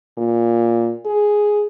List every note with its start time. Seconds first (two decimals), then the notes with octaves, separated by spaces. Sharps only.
0.18 A#2
1.05 G#4